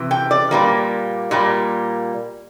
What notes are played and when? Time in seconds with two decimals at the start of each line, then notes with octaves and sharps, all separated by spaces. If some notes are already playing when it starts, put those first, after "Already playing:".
Already playing: C3 E3
0.11 G5
0.31 D5
0.51 A#2 G3 A#3
1.31 A#2 G3 A#3